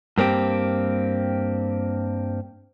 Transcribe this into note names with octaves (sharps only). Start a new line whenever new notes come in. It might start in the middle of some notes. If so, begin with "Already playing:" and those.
G2 A#3 C4 G4